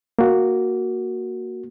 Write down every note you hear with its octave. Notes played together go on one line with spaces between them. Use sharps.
A#3 F#4